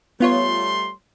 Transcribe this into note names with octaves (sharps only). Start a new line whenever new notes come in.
G3 A3 B3 F4 C#5 C6